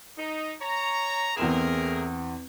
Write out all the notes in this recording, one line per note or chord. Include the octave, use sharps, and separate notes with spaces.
D#4
C#5 A#5
E2 A3 C4 G#4 A#4 E7